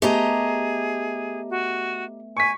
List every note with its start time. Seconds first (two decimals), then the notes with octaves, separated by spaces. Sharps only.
0.02 A3 B3 G4 G#4 D#5 A5 A#5
1.50 F#4
2.37 G#5 C#6 B6